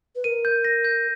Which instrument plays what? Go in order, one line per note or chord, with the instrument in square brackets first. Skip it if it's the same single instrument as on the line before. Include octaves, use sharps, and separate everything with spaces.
[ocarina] B4
[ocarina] A#4 [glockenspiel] D#7
[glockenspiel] G6
A#6
G6